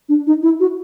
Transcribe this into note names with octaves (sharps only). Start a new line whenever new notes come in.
D4
D#4
E4
F#4